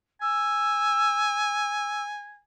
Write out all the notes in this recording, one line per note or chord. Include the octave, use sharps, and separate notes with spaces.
G#5 E6